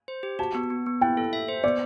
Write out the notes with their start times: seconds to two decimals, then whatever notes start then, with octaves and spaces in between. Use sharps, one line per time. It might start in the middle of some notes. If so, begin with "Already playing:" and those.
0.08 C5
0.23 G4
0.39 F#4 A5
0.55 B3
0.70 B3
0.86 B3
1.01 E4 G5
1.17 A4
1.33 E5
1.48 C5
1.64 B3 D5